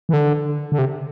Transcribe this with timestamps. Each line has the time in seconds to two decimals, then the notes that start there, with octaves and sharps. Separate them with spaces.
0.09 E3
0.13 D3
0.72 D3
0.78 C3